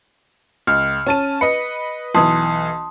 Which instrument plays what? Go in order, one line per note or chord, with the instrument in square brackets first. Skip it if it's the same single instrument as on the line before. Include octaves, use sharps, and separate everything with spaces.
[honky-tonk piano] C#2 [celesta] F6
[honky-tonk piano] C#4 A5 D#7
[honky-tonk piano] B4 D#5 [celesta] C#7
[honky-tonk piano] B1 E3 [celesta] A5 C6 D#6